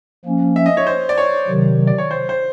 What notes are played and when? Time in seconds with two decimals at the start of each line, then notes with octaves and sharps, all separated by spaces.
0.25 F3 A#3 C#4
0.56 E5
0.66 D#5
0.77 C#5
0.87 C5
1.09 D5
1.18 C#5
1.48 C3 D#3 F#3
1.87 D5
1.98 C#5
2.11 C5
2.29 C5